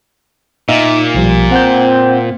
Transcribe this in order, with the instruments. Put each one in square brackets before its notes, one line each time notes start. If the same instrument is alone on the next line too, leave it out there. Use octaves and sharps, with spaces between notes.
[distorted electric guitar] A#2 [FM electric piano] D#4 E5 F5
[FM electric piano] B1 F3 G3
[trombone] C4 [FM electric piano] F#5 G6